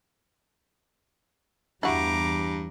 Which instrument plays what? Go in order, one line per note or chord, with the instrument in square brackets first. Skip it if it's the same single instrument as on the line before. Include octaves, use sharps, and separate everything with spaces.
[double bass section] E2 G3 [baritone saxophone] G2 [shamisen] E4 F#4 [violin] A#5 D6